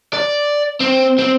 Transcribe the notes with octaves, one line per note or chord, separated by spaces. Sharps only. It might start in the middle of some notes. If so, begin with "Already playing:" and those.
D5
C4
C4